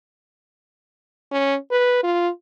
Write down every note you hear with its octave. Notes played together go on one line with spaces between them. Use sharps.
C#4
B4
F4